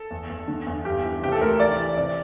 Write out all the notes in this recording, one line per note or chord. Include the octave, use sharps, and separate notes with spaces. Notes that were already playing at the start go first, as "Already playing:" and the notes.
Already playing: A4
E2
E2
D3
E2
G2 G4
E3
C3 G4
A4
D2 A#4
E3 D5
E3
C3 D5